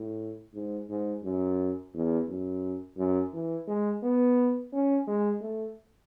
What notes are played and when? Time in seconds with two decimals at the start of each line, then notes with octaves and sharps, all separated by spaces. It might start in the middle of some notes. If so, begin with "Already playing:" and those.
Already playing: A2
0.54 G#2
0.89 G#2
1.24 F#2
1.94 E2
2.28 F#2
2.97 F#2
3.33 E3
3.67 G#3
4.03 B3
4.73 C#4
5.07 G#3
5.41 A3